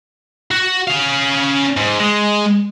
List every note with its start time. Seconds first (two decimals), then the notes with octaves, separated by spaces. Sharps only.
0.51 F#4
0.87 C#4 F5
1.77 G#2
2.00 G#3